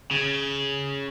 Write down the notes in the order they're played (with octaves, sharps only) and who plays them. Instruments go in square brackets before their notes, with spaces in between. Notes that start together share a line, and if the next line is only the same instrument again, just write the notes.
[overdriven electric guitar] C#3